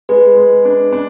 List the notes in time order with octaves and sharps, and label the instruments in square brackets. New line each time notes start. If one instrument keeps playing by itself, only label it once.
[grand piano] G#3 [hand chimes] G#4 B4
[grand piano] G#3
D4
D4